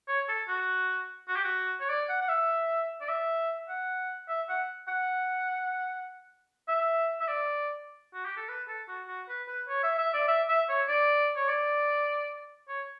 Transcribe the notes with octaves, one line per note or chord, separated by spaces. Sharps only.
C#5
A4
F#4
F#4
G4
F#4
C#5
D5
F#5
F#5
E5
D5
E5
F#5
E5
F#5
F#5
E5
E5
D5
F#4
G4
A4
B4
A4
F#4
F#4
B4
B4
C#5
E5
E5
D5
E5
E5
C#5
D5
C#5
D5
C#5